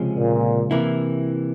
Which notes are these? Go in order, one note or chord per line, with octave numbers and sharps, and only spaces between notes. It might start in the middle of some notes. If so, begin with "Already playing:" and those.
Already playing: C#2 C3 F3 G#3 C#4
A#2
C3 E3 A#3 E4